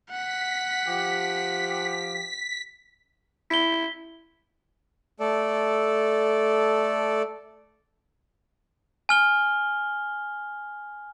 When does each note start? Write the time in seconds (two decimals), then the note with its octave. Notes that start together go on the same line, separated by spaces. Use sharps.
0.10 F#5 B6
0.86 F3 G4
3.50 E4 B6 G7
5.20 A3 A4 D5
9.09 G#5 F6 G7